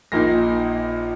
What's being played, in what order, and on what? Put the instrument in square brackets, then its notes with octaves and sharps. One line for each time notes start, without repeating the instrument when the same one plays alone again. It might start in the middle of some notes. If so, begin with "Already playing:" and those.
[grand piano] A#1 A#2 A#3 D#4 A#6